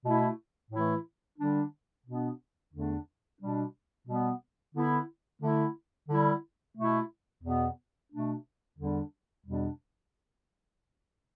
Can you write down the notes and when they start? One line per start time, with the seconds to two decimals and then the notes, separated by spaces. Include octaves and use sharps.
0.04 B2 A3 E4
0.71 A2 E3 A3 E4
1.38 D3 G3 D4
2.06 B2 B3 D4
2.73 E2 D3 A3 D4
3.40 B2 G3 D4
4.08 B2 G3 B3
4.74 D3 B3 E4
5.41 D3 A3 E4
6.09 D3 G3 E4
6.76 B2 A3 E4
7.43 E2 B2 B3
8.10 B2 A3 D4
8.77 E2 D3 G3 D4
9.45 E2 B2 G3 D4